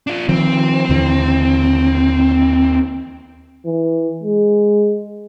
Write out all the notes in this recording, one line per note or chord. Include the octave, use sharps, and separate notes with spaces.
D4 F4
D#3 F3 C4
D#2 D3 E3
E3
G#3